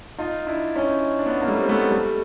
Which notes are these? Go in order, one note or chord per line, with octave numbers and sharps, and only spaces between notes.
D#4 F4
D4 E4
C#4 D#4
D4
B3 C#4
A#3
G3 A3
C4
A3 B3
G3 A3